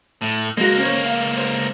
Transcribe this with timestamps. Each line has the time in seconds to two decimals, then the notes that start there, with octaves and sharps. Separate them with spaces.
0.21 A2
0.57 C#2 G#3 A#3 F#4
0.78 C#4 C5 C#5
1.06 F5
1.37 C5